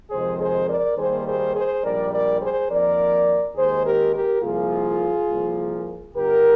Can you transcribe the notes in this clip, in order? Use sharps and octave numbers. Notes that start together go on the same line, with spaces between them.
F2 C3 D#3 G#3 G#4 C5
G#4 C5
A#4 D5
D#2 D#3 G3 A#3 G#4 C5
G#4 C5
G#4 C5
A#1 G#2 G3 A#4 D5
A#4 D5
G#4 C5
F2 D#3 A#3 A#4 D5
D#2 D#3 G#3 G#4 C5
G4 A#4
G4 A#4
C2 A#2 F3 A#3 F4 G#4
C2 A#2 F3 A#3
G1 G2 D3 G4 A#4